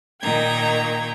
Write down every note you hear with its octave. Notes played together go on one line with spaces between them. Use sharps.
A#2 D#3 D#4 G5 A#5 G#6